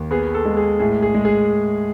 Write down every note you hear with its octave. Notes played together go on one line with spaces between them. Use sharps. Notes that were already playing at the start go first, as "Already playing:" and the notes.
Already playing: D#2
B3 G#4
A4
G#3
G#4
A2 G#4
G#4
G#3
G#4